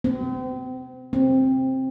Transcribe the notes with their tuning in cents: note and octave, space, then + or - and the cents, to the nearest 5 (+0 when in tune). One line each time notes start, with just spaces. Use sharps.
C4 -35
C4 +10